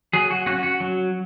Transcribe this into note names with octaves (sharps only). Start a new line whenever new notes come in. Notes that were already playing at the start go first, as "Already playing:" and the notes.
F#3 G#4
F#4
C#4 F#4
F#4
F#3